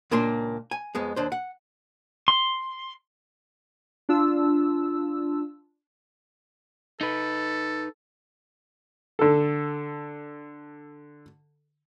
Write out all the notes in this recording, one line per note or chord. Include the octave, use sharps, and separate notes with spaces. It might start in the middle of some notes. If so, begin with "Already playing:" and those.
C#2 A#2 A#3 D4 C6
G#5
F2 G#3 B3
D#2 D4 C5
F#5
C6
D4 F4 E6
D#4 A4 B4
D3 A4